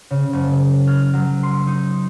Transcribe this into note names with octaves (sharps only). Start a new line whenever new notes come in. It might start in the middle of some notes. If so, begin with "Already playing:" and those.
C#3
F#1
F6
F#3
C6
D#4